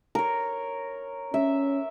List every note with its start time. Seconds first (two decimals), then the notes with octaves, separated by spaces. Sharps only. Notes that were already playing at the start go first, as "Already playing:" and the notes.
0.15 A#4 C#5
1.34 C#4 E5